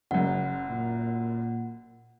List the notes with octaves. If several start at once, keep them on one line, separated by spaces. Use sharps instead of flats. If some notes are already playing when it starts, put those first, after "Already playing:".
F#1 F#2 C#3 F#5
A#2